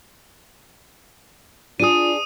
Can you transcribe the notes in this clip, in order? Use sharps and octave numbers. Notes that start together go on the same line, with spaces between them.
D4 F4 G#4 D#6 D#7